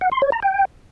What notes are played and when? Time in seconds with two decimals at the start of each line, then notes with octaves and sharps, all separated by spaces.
0.01 F#5
0.12 C6
0.22 C#5
0.32 A#5
0.43 G5